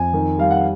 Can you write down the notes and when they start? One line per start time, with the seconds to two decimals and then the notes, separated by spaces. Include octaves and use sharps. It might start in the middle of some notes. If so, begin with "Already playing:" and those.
Already playing: F2 G#5
0.13 D#3
0.38 G3 F5
0.51 F#5